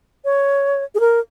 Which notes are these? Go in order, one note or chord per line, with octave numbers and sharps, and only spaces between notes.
C#5
G#4
A#4